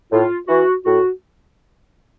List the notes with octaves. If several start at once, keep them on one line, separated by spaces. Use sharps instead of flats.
A2 F4
E3 F#4
A2 F#4